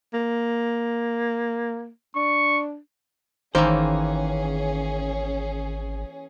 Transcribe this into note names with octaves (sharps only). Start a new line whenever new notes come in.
A#3
D4 C#6
G#1 D#3 E3 A#3 C#4 G#4 C5